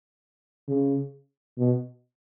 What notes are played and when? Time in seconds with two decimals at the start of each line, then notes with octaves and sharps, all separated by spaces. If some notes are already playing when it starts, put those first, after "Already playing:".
0.68 C#3
1.58 B2